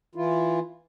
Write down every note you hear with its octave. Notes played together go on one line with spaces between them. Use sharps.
E3 E4 F4